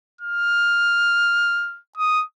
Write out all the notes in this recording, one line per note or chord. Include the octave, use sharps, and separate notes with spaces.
F6
D#6